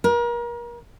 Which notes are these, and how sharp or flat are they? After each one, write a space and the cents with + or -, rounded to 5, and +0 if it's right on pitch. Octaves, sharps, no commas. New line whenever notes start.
A#4 +35